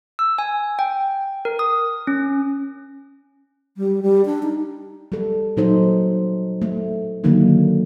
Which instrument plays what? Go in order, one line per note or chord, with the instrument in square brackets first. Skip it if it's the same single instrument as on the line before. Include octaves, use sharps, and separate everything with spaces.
[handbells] E6
G#5
G5
A#4
D#6
C#4
[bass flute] G3
G3
D4
D#4
[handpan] G3 A4
A#2 F#3 D#4 A4 C5
A3
D3 D#3 F#3 A#3 D#4